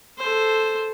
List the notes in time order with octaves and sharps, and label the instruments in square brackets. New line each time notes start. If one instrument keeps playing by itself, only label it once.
[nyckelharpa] A4 C5